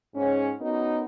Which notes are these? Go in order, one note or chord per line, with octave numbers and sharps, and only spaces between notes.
G#2 C#4
B3 C#4 D#4 F#4 A#4